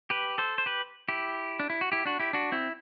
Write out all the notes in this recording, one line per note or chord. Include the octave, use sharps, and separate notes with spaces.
G4 B4
A4 C5
C5
G4 B4
E4 G4
D4
E4
F#4
E4 G4
D4 F#4
E4 G4
D4 F#4
C4 E4